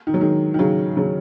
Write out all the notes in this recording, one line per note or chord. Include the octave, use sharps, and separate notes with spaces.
D#3
F#3
D#3 G#3
D#3
C#3 F#3
C#3 F#3